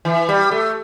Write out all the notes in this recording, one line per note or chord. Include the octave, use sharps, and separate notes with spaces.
E3
G3
A3